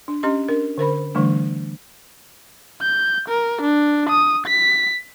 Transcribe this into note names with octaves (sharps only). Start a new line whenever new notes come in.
D4
C#4 G4 D#5 C6
D4 A#4
D3 A#4 C5 B5
D3 E3 G3 A3 D4
G6
A#4
D4
D#6
B6